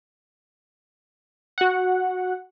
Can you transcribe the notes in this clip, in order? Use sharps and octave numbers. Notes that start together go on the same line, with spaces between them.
F#4 F#5